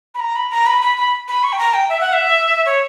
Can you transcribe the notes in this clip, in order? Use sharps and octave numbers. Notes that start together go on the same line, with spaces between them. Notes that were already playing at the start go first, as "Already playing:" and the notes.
B5
A#5
B5
A#5
B5
B5
B5
B5
C#6
G5
A#5
G5
E5
F#5
E5
C#5